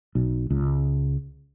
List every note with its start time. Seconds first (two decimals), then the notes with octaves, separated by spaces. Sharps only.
0.15 B1
0.50 C#2